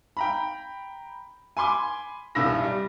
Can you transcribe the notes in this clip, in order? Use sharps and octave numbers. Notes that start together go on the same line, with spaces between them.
G5 A#5 B5
G#5 B5 C6 D6
E1 C2 G2 B5 E6 A#6
G3